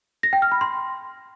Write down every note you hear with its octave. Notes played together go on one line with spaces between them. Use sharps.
A#6
G5
F6
B5
C6